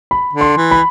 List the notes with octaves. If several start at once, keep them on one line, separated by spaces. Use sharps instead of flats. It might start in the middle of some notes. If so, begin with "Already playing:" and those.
B5
D3
C6
E3
B5